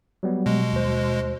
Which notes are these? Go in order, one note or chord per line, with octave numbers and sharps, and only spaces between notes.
F#3 G3 B3
B2 G#3
D#2 C5